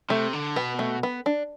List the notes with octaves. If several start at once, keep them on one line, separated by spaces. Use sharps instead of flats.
C3 A3
D3
B2 B3
A3
B3
D4